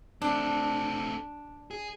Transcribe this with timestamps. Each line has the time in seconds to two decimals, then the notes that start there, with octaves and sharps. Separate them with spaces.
0.22 A3 C4 D4
1.71 G#4